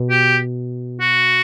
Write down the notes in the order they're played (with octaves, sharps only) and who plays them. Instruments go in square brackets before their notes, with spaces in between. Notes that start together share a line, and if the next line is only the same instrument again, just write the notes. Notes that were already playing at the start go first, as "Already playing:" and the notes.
Already playing: [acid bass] B2
[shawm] G4
F#4